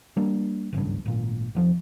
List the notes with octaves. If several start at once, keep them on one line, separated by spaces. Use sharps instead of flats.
G3 A#3 D4
D1 G#1 C#2 G2
G#1 A#2
F1 F2 F3